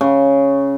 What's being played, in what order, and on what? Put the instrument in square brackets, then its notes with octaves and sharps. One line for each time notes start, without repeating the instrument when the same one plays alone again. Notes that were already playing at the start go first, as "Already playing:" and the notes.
[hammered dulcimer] C#3